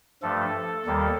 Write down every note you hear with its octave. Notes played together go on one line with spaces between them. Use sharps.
G2 F3 A3 A4
D#2 D#3 G3 A#3